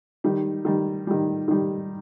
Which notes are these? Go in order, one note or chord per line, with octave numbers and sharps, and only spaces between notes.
D#3 G3 D#4
D#3 G3
D#3 G3
D#3 G3 D#4